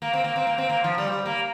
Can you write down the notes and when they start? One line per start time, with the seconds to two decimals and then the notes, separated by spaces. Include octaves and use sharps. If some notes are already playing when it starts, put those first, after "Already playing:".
0.02 A#3
0.13 C4
0.24 A#3
0.36 C4
0.47 A#3
0.58 C4
0.69 A#3
0.84 F3
0.98 G3
1.12 G3
1.26 A#3